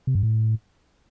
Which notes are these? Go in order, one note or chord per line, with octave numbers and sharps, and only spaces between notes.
C3
G2
A2